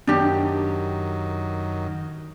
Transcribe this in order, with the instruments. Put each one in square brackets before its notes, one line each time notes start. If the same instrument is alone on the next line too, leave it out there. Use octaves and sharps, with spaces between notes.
[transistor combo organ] F#2 D#3 [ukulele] D4 G4